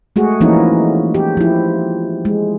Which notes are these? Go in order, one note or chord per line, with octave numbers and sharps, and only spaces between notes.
G#3 A3 F#4 G#4
E3 F3 A#3 C#4 D#4 E4
G4
F3 E4
G#3